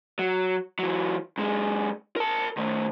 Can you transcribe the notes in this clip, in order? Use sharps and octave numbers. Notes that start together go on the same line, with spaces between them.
F#3
E3 F#3
F#2 G#3
A#4 A5
D#3 A3